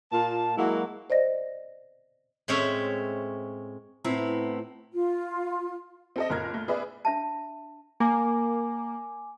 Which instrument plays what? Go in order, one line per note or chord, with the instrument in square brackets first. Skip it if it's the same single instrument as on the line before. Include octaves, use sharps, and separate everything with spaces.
[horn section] A#2 A#3 F4 A5
F#3 G#3 A#3 E4 F#4
[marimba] C5 D5 D#5 A#6
[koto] A2 G#3 C4 C#4 C#5 E5
[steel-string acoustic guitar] A2 B3 C4 E4 A#5
[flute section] F4
[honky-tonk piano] C4 A4 D#5
F#1 A#2 A#4 F6 G#6
A3
B3 G#4 B4 D5 E5
[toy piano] D4 E5 A5
[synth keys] A#3 [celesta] G#5 D6